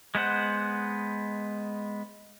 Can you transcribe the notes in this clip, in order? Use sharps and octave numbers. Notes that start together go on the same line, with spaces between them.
G#3 B3 C5 F#5